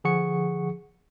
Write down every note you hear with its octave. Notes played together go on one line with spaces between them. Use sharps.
D3 F3 G#4 F#5 C#6 C#7